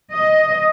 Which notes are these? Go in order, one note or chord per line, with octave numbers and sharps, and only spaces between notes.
D#5